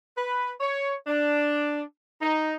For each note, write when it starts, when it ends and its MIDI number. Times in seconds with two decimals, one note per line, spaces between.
0.18 0.52 71
0.61 0.94 73
1.07 1.81 62
2.21 2.54 63